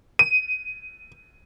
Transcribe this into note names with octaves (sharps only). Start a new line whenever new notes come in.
D#7